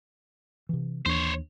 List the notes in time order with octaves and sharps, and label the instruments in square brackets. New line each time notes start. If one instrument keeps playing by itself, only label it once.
[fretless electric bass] C3 E3
[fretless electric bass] D#2 E3 D4 [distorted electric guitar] C5 C#5